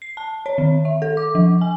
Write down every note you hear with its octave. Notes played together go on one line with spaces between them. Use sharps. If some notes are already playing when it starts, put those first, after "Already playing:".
C7
A5
C#5
D#3
E5
A4
D6
F3
G#5